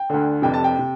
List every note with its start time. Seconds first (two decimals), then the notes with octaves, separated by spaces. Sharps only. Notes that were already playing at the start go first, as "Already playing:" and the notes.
Already playing: G5
0.10 D2 D3
0.42 F1 F2 C3 G5
0.54 A5
0.64 G5
0.79 C3